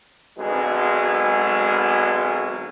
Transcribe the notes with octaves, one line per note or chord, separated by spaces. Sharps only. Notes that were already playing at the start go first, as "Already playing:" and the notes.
G#1 B2 D3 F#3 G#3